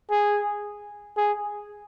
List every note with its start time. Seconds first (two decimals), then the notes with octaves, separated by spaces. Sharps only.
0.11 G#4
1.17 G#4